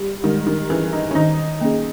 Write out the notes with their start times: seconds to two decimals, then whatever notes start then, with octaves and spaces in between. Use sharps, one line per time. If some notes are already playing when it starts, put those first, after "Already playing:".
Already playing: G3
0.24 D#3 G#3
0.47 D#3
0.70 E3 C#4 G#4
0.93 D#4
1.11 C#4
1.15 D#3 D#4
1.61 A#3 C#4 G#4